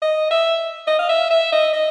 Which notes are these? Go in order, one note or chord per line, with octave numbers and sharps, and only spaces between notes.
D#5
E5
D#5
F5
E5
E5
D#5
D#5